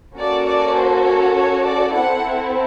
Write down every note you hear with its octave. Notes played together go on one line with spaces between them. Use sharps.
A#3 C#4 F#4 A4 D5
D5
C5
C#5
C#5
D5
C4 E4 A4 F#5